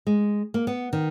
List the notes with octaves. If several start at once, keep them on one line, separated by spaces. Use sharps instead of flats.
G#3
A#3
B3
D#3